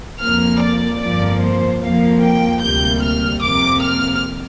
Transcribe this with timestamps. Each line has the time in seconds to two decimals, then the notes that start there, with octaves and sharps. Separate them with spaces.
0.20 F2 F3 A#3 F6
0.61 D5
1.01 G1 F2 F3 A#3 D5
1.41 C5
1.81 F2 F3 A#3 F5
2.22 G5
2.61 D2 C3 G3 A#3 G6
3.02 F6
3.42 F2 C3 A#3 D6
3.82 F6